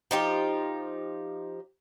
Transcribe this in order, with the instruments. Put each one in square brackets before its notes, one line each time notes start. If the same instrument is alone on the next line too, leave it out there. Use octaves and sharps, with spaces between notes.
[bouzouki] F3 D#4 G4